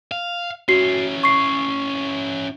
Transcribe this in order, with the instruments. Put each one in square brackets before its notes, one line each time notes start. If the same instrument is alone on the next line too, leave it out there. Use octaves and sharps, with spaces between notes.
[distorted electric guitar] F5
[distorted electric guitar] C#4 E4 [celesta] F#4 C7
[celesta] C#6 C7